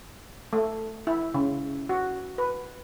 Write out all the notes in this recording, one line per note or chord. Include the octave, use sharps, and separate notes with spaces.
A3
E4
C#3
F#4
B4